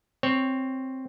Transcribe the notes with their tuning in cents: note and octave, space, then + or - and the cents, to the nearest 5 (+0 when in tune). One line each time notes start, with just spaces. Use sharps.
C4 +5 C#5 +0